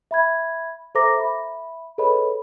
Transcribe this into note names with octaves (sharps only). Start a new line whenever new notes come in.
E5 B5 G#6
A4 C5 E5 A#5 D6 A#6
E5 B5
G#4 A4 B4 C#5 D#5 B5